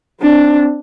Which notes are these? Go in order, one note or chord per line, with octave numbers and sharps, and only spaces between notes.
C4 D4